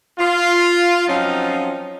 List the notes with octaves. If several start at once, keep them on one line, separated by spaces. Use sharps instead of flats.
F4
F3 F#3 C4 C#4 D#4 F4